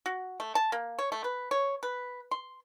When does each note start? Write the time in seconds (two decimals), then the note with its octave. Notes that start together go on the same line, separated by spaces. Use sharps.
0.06 F#4
0.40 A3
0.55 A5
0.72 A#3
0.99 C#5
1.12 A3
1.24 B4
1.51 C#5
1.83 B4
2.31 C6